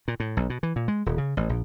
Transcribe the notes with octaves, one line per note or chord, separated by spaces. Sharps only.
A#2
A2
B1
B2
E3
A#2
G#3
D#1
C#3
A1
A#1